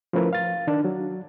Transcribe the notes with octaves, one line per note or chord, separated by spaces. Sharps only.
F3 A3 C#4 E4 A#4 B4
F5 A6
D#3 D4
F#3